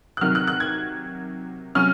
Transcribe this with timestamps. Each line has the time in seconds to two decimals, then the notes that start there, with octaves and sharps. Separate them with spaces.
0.17 F#6
0.21 C3 D#3 F#3 F6
0.35 F#6
0.47 F#6
0.60 G#6
1.75 C3 F#3 C#4 F6